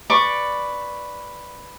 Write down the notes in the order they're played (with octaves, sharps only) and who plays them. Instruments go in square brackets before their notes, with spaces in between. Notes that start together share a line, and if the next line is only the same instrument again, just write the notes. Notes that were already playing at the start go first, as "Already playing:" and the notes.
[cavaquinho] B4 D5 C#6